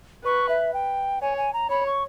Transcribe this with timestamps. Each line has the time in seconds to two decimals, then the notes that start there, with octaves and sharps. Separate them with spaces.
0.24 B4 C#6
0.49 E5
0.74 G5
1.22 C#5 G#5
1.38 G#5
1.53 A#5
1.70 C#5 B5
1.86 C#6